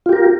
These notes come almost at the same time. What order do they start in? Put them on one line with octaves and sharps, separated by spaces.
F4 G4 A#4